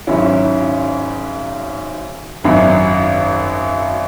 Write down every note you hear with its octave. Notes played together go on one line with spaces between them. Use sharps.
G#1 G#2 F#3 C#4 E4
G#1 F#2 F#3